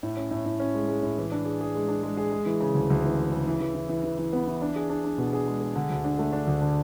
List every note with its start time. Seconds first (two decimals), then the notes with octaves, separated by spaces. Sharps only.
0.03 A2
0.17 C#4
0.31 A2
0.46 A2
0.60 C#4
0.74 G#3
0.88 G#3
1.03 A2
1.18 E3
1.32 D4
1.46 G#4
1.61 G#4
1.75 G#3
1.88 D4
2.03 G#3
2.17 G#4
2.32 G#3
2.46 E3
2.60 C#3
2.75 D2
2.90 D2
3.04 E3
3.18 E3
3.32 C#3
3.47 E3
3.60 E3
3.75 E3
3.89 E3
4.04 E3
4.18 E3
4.33 B3
4.47 E3
4.62 D4
4.76 G#4
4.90 D4
5.04 D4
5.18 B2
5.33 G#4
5.48 G#3
5.61 G#4
5.75 D3
5.90 D2
6.04 D4
6.19 A3
6.33 D4
6.47 D2
6.61 D3